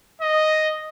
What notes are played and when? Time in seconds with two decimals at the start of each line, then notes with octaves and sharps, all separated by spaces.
0.22 D#5